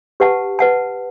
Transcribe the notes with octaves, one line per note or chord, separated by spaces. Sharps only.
G4 B4 F#5 A5
B4 F#5 A5